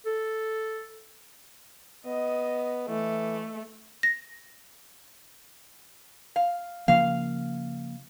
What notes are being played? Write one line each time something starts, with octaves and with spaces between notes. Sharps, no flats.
A4
B3 D#5
E3 A3
A#6
F5
C#3 F3 A#3 F5